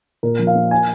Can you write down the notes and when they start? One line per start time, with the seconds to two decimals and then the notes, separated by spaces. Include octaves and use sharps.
0.23 A#2 A#4
0.39 F3
0.47 F5
0.55 A#3
0.71 G#5